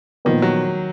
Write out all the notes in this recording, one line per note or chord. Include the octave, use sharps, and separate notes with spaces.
A#2 D#3 F3 B3
F#3